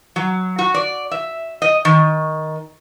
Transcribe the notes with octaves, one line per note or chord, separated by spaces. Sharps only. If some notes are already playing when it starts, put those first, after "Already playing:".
F#3
F#4
D5
E5
D#5
D#3